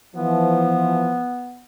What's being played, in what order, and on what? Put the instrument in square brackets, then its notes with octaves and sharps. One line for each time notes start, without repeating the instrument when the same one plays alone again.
[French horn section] E3 F3 [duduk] B3